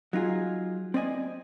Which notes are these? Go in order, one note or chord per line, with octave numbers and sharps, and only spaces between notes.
F#3 D#4 F4 G#4
C4 D5 D#5 G#5